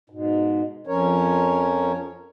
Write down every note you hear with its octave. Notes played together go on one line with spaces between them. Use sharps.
G#2 B2
F2 F3 C#4 A#4 C#5